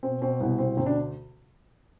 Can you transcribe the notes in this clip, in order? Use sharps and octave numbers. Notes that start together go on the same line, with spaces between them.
B2 C4
B2 C4
C2 B3
B2 C4
D2 C4
D4